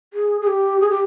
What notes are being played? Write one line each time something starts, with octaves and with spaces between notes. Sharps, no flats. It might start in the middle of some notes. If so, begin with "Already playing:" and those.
G#4
G#4
G4
G#4
G4